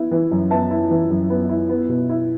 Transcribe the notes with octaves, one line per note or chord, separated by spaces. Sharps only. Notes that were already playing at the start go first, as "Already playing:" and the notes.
Already playing: B3 E4
E3
F#2
B3 E5 A5
E4
E3
F#2
B3
E4
B3
B2
E4